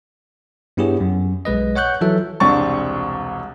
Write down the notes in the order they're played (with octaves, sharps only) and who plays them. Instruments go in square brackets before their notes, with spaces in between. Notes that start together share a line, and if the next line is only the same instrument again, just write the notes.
[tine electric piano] G2 B3 E4 G4 G#4 C#5
F#2
B1 G#3 B4 D#5
C#5 F#5 C#6 F#6 G6
E3 F#3 F4 A4 E5
[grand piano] E1 C2 C4 D4 C#6 A6